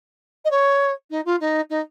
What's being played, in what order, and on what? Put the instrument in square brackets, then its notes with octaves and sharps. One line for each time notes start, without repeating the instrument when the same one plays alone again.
[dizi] D#5
C#5
D#4
F4
D#4
D#4